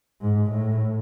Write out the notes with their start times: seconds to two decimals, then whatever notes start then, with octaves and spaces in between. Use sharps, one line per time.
0.21 G#2
0.51 A2